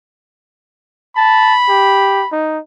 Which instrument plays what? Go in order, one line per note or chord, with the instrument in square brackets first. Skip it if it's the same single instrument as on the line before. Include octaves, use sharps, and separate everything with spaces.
[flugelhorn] A5 [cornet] B5
[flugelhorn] G4
D#4